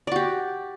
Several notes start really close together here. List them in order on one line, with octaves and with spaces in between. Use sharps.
D5 F#4 G4